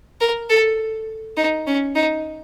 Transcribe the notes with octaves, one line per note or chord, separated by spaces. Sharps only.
A#4
A4
D#4
C#4
D#4